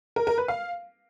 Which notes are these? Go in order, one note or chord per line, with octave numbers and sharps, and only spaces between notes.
A#4
A#4
B4
F5